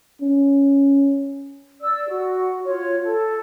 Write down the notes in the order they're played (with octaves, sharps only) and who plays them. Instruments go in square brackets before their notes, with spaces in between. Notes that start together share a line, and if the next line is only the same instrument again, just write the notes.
[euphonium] C#4
[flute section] D5 E6
F#4
F4 C#5
A4